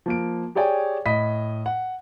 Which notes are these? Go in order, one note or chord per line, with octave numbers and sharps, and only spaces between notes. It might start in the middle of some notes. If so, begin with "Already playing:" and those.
F3 A#3 D7
G4 G#4 C#5 D5 G5 G#5
A2 D#5 B5 B6
F#5